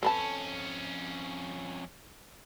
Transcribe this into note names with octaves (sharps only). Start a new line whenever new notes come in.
F2 C#4 A4 B4 A5